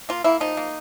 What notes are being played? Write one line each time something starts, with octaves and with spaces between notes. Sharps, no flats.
A#3 F4
A#3 E4
F3 D#4
A#3